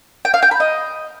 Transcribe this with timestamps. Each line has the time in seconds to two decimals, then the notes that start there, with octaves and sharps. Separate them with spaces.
0.25 G5
0.34 F5
0.42 G5
0.51 B5
0.60 D#5